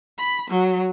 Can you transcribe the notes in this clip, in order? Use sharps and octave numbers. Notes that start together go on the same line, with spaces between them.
B5
F#3